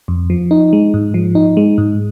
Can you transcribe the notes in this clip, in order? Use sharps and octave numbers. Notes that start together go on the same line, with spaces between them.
F2
F3
D#4
G#3
G#2
F3
D#4
G#3
G#2